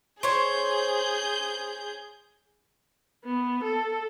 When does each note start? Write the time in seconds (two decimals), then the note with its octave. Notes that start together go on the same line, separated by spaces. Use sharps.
0.23 G#4 C5 C#5 G6
3.25 B3
3.64 A4